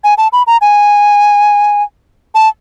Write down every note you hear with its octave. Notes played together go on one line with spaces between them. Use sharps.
G#5
A5
B5
A#5
G#5
A5